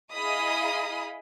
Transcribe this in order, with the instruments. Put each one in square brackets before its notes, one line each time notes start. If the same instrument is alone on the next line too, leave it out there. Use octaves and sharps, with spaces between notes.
[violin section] E4 G#4 D#5 F5 B5 D#6